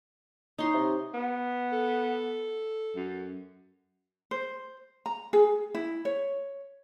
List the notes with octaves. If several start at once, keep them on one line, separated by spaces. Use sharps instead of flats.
D#4 C#5 C6
C3
B3
A4
F#2
C5
A#5
G#4
E4
C#5